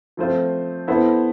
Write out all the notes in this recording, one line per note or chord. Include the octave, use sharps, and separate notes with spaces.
F3 A3 C4 F4 C5
B3 E4 A4 C5